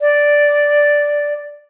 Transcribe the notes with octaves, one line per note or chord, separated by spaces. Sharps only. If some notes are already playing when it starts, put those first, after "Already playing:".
D5